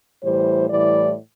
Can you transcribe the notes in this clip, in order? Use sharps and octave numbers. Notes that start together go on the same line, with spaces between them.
A2 E3 G3 C5
A2 E3 G3 D5